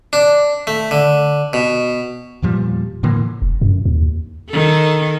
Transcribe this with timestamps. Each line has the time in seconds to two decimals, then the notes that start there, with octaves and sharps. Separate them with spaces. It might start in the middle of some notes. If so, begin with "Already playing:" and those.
0.13 D4
0.67 A3
0.91 D3
1.53 B2
2.42 E2 A#2 F3 G3
3.03 A2 D3 E3 A#3
3.42 E1
3.61 F#2
3.85 D#2
4.50 D#3 A4